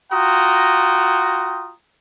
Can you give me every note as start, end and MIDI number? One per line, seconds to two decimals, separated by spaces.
0.12 1.74 65
0.12 1.74 66
0.12 1.74 79
0.12 1.74 82
0.12 1.74 87